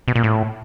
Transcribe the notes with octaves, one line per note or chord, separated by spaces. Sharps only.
B2
A#2
A2